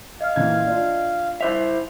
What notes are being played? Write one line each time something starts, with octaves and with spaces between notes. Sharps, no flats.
D#5 F5 F6
A#2 E3 G#6
D4 F4
E4 C5 E5 F7